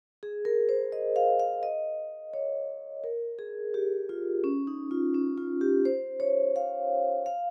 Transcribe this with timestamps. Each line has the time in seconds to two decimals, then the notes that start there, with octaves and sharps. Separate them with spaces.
0.23 G#4
0.45 A#4
0.69 C5
0.92 D#5
1.16 F5
1.40 F5
1.63 D#5
2.34 C#5
3.04 A#4
3.39 G#4
3.74 G4
4.09 F4
4.44 C#4
4.67 D#4
4.91 F4
5.14 C#4
5.38 F4
5.61 G4
5.85 C5
6.20 C#5
6.56 F5
7.26 F5